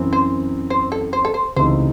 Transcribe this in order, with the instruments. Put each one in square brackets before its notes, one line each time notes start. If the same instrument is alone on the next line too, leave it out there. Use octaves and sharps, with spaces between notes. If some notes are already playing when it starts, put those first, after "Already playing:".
Already playing: [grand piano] F#2 E3 C4
[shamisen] C5
C5
A4
C5
A4
C5
[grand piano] C#2 C3 E3 A3 D#4 [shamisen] C5